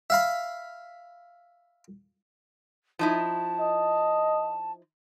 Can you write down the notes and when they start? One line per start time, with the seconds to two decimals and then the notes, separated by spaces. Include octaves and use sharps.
0.10 E5 F5 B5
2.99 F3 D#4 E4 A5
3.60 D#5